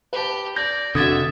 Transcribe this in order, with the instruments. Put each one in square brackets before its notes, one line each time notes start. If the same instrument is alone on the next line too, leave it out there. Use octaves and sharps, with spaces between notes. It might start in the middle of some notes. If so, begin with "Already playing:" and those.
[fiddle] G4 [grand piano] B4 A5
[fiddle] D5 [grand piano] G6 [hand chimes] A#6
[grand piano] F1 F#4 [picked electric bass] D3 [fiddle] E5 [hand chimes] D#6 G#6 A6